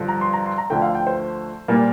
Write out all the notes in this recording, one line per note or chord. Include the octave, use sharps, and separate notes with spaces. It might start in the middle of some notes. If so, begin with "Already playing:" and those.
Already playing: G2 D3 F3
A#5
C6
A#5
C6
A#5
D2 D3 F3 A3 G5
F5
G5
C5
A#2 G3 A#3